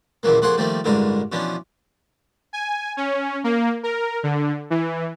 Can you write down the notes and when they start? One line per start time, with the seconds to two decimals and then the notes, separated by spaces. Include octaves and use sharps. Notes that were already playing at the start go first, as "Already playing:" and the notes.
0.23 D#2 A#2 C#3 E3 F#3 A#3
0.42 F2 A#3 F#4 G#4 F#5 C6
0.57 D#3 F3 G3 A3 A#3
0.84 A1 G2 D3 E3 G#3 A#4
1.32 B2 E3 F3 C#4 D4
2.53 G#5
2.97 C#4
3.44 A#3
3.83 A#4
4.23 D3
4.70 E3